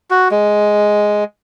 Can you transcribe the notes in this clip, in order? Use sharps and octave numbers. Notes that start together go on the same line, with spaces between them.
F#4
G#3